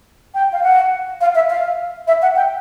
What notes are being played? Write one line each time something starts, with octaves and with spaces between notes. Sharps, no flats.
G5
F5
F#5
F5
E5
F5
E5
F#5
G5